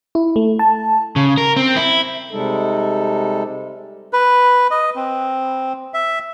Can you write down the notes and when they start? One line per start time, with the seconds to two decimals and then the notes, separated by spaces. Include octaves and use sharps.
0.15 E4
0.36 A3
0.59 A5
1.16 C#3
1.38 A#4
1.56 C4
1.77 E4
2.31 C3 G3 G#3 D#4 A4
4.13 B4
4.71 D#5
4.96 C4
5.94 E5